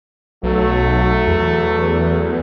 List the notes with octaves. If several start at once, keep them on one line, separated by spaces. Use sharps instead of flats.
B1 F#3 A3
E2